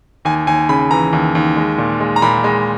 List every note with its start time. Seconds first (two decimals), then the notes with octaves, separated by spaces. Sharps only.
0.25 D#2 G#5
0.47 D#2 G#5
0.69 C#3 B5
0.91 E3 A#5
1.13 D#2
1.35 D#2
1.57 G#3
1.78 A#2
2.00 G#3
2.16 A#5
2.22 A#2 B5
2.44 G#3